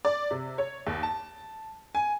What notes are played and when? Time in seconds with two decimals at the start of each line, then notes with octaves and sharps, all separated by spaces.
0.05 D5
0.31 C3
0.58 C#5
0.87 D#2
1.03 A5
1.95 G#5